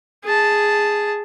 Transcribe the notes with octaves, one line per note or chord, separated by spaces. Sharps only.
G#4 A5